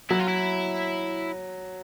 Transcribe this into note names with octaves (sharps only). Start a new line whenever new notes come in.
F#3 E4
F4
E4